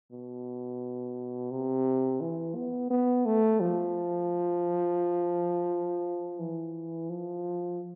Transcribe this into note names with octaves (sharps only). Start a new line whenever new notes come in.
B2
C3
E3
B3
B3
A3
F3
E3
F3